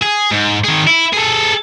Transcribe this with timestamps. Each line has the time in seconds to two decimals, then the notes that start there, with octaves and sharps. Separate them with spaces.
0.02 G#4
0.31 G#2
0.64 D#3 G#4
0.87 E4
1.13 G#4 A4